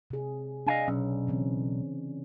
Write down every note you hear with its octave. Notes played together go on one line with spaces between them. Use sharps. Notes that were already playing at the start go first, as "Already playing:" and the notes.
C3 G#4
D4 D#5 F5 G#5
B1 C#4
C#3 E3 C4